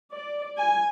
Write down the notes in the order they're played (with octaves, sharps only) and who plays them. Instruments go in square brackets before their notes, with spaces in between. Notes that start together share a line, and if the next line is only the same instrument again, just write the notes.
[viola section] D5
G#5